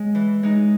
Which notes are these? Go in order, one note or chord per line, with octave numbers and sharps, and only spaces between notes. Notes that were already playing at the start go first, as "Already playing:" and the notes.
Already playing: G#3
E3
G#3 D#4